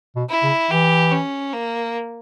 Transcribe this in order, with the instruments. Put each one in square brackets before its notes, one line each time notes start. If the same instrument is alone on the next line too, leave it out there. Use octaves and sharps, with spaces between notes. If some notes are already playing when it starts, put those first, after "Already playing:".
[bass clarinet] B2
[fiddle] E4
[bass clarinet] C#3
[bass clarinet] E3 [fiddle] G4
[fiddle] C#4
A#3